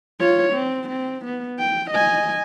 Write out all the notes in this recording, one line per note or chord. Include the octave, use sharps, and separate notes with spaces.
F4 C#5
C4
C4
B3
G5
D#5 G#5